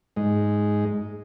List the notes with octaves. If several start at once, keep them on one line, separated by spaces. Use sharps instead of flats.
G#2 G#3